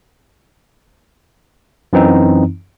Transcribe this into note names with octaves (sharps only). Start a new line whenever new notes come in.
F#2 E3 C4 D#4